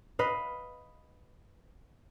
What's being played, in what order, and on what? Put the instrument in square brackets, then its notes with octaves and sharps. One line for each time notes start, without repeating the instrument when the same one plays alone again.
[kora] B4 D#5 F5